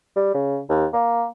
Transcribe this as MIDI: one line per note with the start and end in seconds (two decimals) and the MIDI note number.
0.16 0.32 55
0.34 0.59 49
0.70 0.86 39
0.93 1.26 58